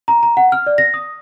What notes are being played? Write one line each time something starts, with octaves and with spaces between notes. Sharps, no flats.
A#5
A#5
F#5
F6
D5
A#6
D#6